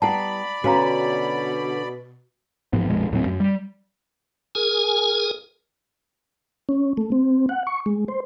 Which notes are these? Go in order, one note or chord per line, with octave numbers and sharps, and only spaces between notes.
G3 B3 E4 D5 F#5 A5 B5
B2 D3 C#4 D4 F#4 F5 A#5
A1 G#2 F3 B3
A#1 F2 B2 G#3
D#1 A2 F#3 C4
F#2
G3
G#4 A#4 G#5
C#4
A3
C4
F#5
C#6
G#3
C5